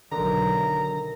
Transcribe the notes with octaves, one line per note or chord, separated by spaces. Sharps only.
B1 D3 D#3 A4 A#4 A#5